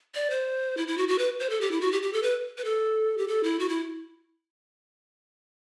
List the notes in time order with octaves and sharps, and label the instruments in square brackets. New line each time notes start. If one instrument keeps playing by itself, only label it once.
[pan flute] D5
C5
E4
E4
F#4
F#4
B4
C5
A4
G4
E4
F#4
G4
G4
A4
B4
B4
A4
G4
A4
E4
F#4
E4